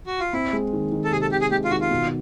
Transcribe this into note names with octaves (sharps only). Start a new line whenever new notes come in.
F#4
F4
C4 E4
G#3
D#3
D#3
A4
C3 G#4
A4
C3 G4
G#4
G#3 G4
F4
D#3 F#4
F4
B2